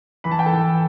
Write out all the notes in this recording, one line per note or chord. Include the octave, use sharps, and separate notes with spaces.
E3 B5
A5
G5
A4 A5
E3